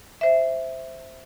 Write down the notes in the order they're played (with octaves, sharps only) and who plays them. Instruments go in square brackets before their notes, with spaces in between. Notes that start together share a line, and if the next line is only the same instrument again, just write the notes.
[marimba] C5 E5